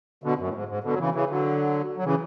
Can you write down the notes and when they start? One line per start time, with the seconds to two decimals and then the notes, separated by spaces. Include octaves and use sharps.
0.24 B2 D3
0.39 F#2
0.49 A2
0.54 G#2
0.69 G#2
0.84 B2 D3
0.93 F#3
0.99 C#3 E3
1.14 C#3 E3
1.29 D3 F#3
1.97 F#3
2.05 C#3 E3